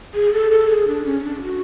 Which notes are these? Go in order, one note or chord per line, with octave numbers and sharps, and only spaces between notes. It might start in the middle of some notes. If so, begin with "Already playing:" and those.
G#4
A4
A4
G#4
D4
C#4
D4
F#4